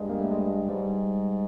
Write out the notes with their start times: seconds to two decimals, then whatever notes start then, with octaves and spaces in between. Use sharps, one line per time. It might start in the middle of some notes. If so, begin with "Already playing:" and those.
Already playing: G2 G#3
0.09 A#3
0.20 A3
0.31 G#3
0.69 G#2 G3